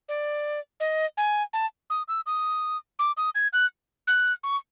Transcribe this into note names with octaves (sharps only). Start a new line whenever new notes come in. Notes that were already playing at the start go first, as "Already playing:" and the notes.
D5
D#5
G#5
A5
D#6
E6
D#6
D6
D#6
G#6
F#6
F#6
C#6